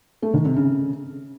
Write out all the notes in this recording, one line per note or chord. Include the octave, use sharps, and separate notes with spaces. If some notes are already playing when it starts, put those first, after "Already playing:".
A3
D#3
C3
C#3